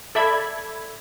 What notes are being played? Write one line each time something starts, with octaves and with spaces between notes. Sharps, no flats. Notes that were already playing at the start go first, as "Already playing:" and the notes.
A4 D5 E5 B5 G#6